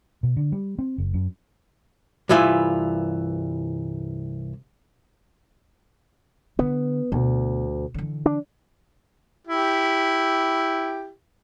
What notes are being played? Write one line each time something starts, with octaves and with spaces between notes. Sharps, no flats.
B2
D3
G3
C4
F#1
F#2
C2 G2 E3 E4 F4 G#5
D3 B3
D2 B2
D3 E3
D4
E4 G4